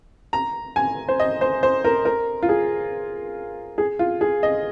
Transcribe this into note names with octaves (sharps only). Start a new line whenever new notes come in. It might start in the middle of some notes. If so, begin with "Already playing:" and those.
A#5
G#5
C5
D#5
C5
C5
A#4
A#4
F4
G#4
G#4
F4
G#4
D#5